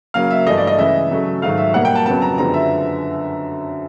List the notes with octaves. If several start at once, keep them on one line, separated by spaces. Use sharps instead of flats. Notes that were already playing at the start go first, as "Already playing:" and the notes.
C#3 F#3 A#3 F5
E5
G2 E3 A3 D#5
D5
D#5
C#3 E3 G#3 E5
C#3 F#3 A3
G#2 D#3 F#3 A3 F5
E5
B2 G3 A#3 F#5
G5
A5
F2 C#3 F#3 B3 A5
A#5
F#2 D3 F3 G#3 B3 A#5
E5